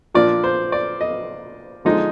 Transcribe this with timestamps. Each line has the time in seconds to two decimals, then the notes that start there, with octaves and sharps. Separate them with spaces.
0.15 A#2 F3 A#3 D4 F4 D5
0.44 C5
0.72 D5
1.01 D#5
1.85 D3 F3 G#3 D#4